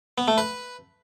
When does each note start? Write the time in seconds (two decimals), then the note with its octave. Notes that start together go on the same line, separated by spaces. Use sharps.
0.18 B3
0.28 A3
0.38 B4